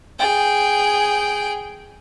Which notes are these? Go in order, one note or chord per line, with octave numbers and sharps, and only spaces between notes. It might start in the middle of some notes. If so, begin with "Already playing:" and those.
G#4 G5